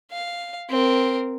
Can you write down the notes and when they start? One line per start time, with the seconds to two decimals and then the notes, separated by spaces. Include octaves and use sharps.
0.11 F5
0.70 C4 A#4